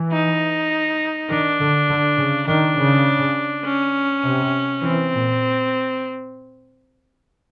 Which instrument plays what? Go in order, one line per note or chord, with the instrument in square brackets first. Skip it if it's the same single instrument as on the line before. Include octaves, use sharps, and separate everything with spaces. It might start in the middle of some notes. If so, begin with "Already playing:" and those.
Already playing: [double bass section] E3
[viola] D#4
[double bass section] D#3 [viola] D4
[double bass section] D3
D3
C#3
[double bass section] D#3 [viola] D4
[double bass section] C#3
[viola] C#4
[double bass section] C3
[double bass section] E3 [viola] C4
[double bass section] A#2